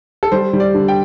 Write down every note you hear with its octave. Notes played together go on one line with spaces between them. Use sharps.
A4
G3 C5
G3
D5
D3
G5